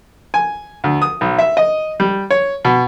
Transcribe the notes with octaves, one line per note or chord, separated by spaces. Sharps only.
G#5
D2
D#6
B1
E5
D#5
G3
C#5
B2